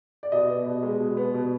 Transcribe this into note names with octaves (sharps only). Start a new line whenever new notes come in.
D5
B2 D#5
B3
B2
G#3
B2
B3
B2